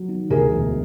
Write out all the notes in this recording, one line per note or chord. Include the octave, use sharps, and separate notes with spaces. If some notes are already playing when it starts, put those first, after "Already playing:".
Already playing: F#3
D#3
D2 G#4 A#4
E1